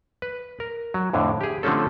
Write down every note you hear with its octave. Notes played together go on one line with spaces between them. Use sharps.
B4
A#4
F#3
F2 A2 D3
G4 G#4
D3 F3 A3 C4 C#4 A4